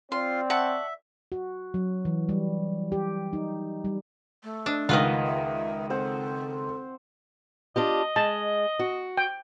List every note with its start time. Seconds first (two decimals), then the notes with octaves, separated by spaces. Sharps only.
0.12 C4 F4 D5 F5 C6
0.50 E5 F#5 A5 C#6
1.32 F#4
1.74 F#3
2.05 E3
2.29 G3
2.92 G4
3.33 D#4
3.85 G3
4.43 A3
4.66 D4 D#5
4.89 C#2 D#3 F4 B4 D#5 F#5 C6
5.26 E5
5.90 C4 A4 C5 F#5
7.76 D4 F4 G4 D#5
8.16 G#3 A5
8.79 F#4
9.17 G5